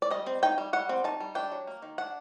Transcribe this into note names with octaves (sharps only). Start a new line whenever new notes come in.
D5
G3 D#5
C4
D#4 G5
G3
G3 F#5
C4
D#4 A5
G3
D4 G5
F#3
A#3
D#3
D4 F#5